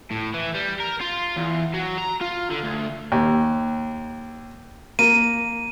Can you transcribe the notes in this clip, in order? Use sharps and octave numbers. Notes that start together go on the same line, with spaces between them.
A2
E3
G3
A#4
F4
E2
F#3
A#5
F4
D3
D2
D#2
A#3 D#7